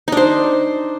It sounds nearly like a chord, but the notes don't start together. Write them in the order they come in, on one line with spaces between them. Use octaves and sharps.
D#4 D4 C5